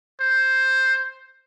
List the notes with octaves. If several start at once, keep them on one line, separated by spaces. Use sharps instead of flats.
C5